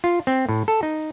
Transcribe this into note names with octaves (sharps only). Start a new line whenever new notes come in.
F4
C4
A2
A4
D#4